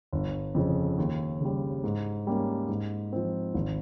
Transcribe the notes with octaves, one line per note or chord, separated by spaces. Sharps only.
G1
F2 C#3 F3
D#2
C#3 G3
G#2
G3 A#3 C#4
G#2
F3 C4
G#1